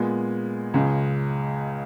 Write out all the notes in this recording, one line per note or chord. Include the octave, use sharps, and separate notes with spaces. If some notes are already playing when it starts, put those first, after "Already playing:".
Already playing: A#2 G#3 B3
C#2 C#3 G#3